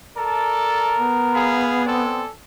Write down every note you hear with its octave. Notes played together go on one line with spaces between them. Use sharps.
A4 A#4 D5 A5
B3
G#4 F5 B5
C4 A4 D5 G#5